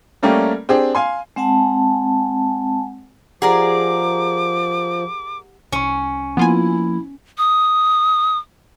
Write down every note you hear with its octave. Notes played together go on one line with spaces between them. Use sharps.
G3 A3 A#3 C#4 G4
C4 D4 G4 G#4
F5 G#5 C6
G#3 C4 F#5 G#5 A5
F3 G4 G#4 A#4 D5 F#5 D6
C2 C#4 C#6
F3 A#3 B3 E4 F4 G#5
D#6